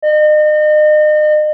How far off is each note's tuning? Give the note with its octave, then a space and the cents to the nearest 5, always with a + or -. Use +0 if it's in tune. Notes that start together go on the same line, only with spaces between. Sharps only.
D#5 -40